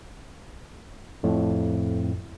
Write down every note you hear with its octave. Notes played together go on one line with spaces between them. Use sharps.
F2 A2